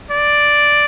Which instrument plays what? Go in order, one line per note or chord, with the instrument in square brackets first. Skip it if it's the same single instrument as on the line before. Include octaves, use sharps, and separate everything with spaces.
[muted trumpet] D5